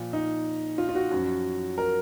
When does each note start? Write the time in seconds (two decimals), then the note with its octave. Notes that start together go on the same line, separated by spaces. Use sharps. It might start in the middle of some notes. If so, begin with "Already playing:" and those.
Already playing: A#2 F3
0.13 D#4
0.78 F4
0.89 F4
0.95 F#4
1.11 F#2 F3
1.78 A#4